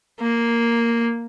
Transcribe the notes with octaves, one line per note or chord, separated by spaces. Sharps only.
A#3